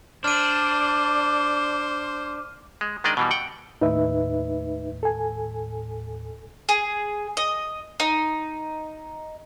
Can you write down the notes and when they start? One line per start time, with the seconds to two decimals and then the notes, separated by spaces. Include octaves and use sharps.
0.24 D4 C5 D6 F6 D#7
2.81 G#3
3.04 D#3 G#3 D4 D5 D#5
3.17 B2 E3 G3
3.31 F#5 G5
3.81 D#2 A2 D#4 B4 E5
5.03 A4 G#5
6.69 G#4
7.37 D#5
8.00 D#4